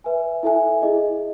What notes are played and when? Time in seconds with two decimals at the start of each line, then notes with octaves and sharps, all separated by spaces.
0.04 B4 E5 G#5
0.43 E4 A4 E5 G#5
0.82 E4 G#4 D#5